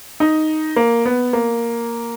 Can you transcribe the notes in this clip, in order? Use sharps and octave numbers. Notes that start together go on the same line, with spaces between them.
D#4
A#3
B3
A#3